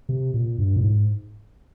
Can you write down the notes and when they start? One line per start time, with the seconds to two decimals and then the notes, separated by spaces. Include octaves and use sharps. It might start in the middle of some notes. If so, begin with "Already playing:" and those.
0.09 C3
0.34 A#2
0.59 G2
0.76 A#2
0.83 G#2